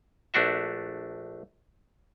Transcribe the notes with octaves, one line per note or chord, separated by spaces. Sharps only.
A#1 A3 D4 F#4 E5